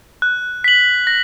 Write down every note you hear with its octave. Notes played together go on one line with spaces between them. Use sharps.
F#6
B6 F#7
A#6